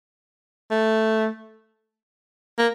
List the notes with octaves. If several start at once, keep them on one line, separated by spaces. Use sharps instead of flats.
A3
A#3